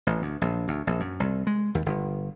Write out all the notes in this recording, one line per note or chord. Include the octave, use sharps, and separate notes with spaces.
A1
D2
A#1
D2
A#1
F#2
C2
G#3
D#2
G1